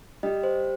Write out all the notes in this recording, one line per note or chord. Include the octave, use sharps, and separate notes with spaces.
G3 D#5
C5